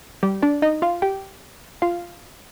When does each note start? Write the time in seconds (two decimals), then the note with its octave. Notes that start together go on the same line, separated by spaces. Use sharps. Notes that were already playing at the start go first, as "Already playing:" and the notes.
0.23 G3 G4
0.42 D4 D5
0.62 D#4 D#5
0.82 F4 F5
1.02 G4 G5
1.82 F4 F5